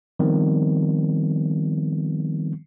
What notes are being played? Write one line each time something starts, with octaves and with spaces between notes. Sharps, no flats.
D#3 F3 G3 B3 C4